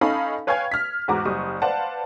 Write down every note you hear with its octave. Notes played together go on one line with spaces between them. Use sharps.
C#4 D#4 A4 F5 G#5 B5
B4 C#5 F5 G5 G#5 G#6
F6 B6
E2 G#2 F#4 A#5 D6
F#1 G3 C#6 D#6
B4 C5 D5 F5 F#5 A5